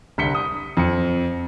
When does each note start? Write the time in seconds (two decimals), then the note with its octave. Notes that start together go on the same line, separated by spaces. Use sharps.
0.18 C2 D3 B6 C#7 G7
0.35 D#6
0.77 F2 C#7